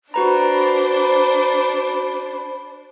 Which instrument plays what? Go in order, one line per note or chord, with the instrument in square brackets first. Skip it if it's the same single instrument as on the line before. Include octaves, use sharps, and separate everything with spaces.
[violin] D4 C5 [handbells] F#4 B4 A#5 [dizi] B5